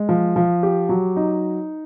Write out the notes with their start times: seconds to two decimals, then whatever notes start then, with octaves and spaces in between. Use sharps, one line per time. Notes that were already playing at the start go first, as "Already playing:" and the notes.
Already playing: G#3
0.09 F3
0.36 F3
0.63 G4
0.89 F#3
1.16 D#4